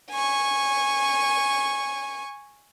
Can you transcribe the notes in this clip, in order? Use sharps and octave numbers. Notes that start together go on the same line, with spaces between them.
G#5 C#6